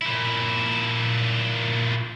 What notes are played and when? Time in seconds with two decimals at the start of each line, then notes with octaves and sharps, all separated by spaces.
0.02 A#2 E4